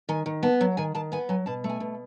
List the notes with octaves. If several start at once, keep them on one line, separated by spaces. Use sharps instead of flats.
D#3 G#5
D#3
B3 A5
F#3
D#3 G#5
D#3 A5
B3 G#5
F#3 G#5
B2 A5
A3
G#5
B2